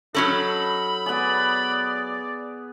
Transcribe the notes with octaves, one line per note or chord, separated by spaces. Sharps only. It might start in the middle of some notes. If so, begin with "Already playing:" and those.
F#3 C#4 D#4 A4 B5
B3 G#4 D5